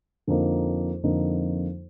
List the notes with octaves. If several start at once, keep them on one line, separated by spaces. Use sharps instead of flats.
F2 D3 F3 A#3 D#4
F2 D3 F3 A#3 D#4